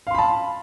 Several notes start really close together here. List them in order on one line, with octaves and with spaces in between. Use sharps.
F5 C6 B5 A5